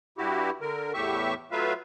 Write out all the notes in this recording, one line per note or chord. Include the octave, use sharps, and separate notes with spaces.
G2 E4 F#4 G4
D3 A#4
E2 A2 G4 E5 C#6
F#3 A3 F4 B4 E5 F5